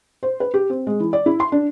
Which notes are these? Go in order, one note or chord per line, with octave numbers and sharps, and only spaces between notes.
C5
B4
G4
C4
G#3
E3
D5
E4
C6
D4